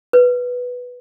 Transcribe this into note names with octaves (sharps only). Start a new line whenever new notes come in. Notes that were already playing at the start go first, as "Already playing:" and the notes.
B4